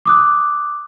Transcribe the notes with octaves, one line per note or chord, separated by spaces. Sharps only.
D6 D#6 F#6